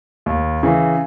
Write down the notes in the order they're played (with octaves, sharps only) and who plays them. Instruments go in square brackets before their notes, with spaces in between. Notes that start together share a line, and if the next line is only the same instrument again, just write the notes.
[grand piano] D#2
C#3 E3